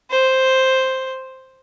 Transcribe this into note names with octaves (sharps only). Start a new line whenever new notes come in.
C5